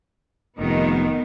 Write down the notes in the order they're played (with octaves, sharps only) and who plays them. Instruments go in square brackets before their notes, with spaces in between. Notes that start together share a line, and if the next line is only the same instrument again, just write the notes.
[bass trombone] F1 [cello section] D#3 B3